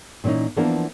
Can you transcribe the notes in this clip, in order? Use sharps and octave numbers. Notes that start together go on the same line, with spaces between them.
A#2 E3 A#3 C#4 D#4
E3 F3 A#3 B3 D4 A#4